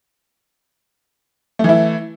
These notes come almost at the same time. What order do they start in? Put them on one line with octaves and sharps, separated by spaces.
A3 E3 E4